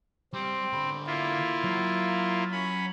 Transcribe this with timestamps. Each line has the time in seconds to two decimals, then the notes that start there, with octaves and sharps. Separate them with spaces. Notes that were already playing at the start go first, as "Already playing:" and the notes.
0.33 G3 C4
0.73 D3 B5
1.06 A#3 E4 F4
1.64 F#3
2.52 C#4 B5